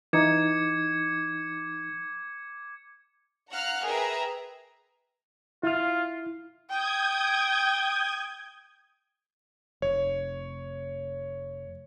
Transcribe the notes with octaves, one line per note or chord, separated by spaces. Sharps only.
E3 D#4 D6 G#6 C#7
F5 F#5 A#5 F6 F#6
G#4 A#4 B4 E5 G5 A#5
E4 F4 F6
G5 D#6 G6 G#6
F1 C#5